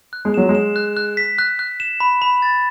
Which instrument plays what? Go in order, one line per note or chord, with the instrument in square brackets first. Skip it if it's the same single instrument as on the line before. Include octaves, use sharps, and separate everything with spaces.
[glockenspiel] F#6
[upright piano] G#3
[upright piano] F#3 [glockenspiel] E7
[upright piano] G#3
[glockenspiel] E7
F#6
F#6
B6
F#6
F#6
E7
B5
B5
A6